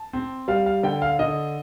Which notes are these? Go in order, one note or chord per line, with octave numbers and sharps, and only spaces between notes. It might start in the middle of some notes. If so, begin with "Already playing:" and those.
Already playing: A5
C4
G3 F5
F5
D3 G5
F5
D3 D#5